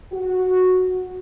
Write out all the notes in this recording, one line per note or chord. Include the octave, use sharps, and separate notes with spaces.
F#4